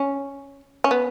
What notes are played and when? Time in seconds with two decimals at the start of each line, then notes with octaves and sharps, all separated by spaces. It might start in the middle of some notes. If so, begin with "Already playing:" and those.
Already playing: C#4
0.84 C#4
0.91 B3